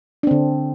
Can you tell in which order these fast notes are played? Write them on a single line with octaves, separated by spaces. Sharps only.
D4 C4 D3